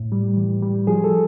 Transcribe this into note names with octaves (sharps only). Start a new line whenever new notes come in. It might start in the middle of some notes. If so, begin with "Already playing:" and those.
Already playing: A2
G3
E3
G3
F3 G#4
A4